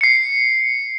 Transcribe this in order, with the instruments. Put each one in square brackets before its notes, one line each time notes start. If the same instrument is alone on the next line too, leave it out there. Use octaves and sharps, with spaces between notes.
[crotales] C7 C#7